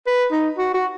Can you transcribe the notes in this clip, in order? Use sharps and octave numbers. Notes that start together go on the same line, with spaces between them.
B4
D#4
F#4
F#4